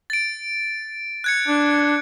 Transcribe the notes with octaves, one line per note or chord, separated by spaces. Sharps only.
A6 D7
F#6 G#6 C#7
D4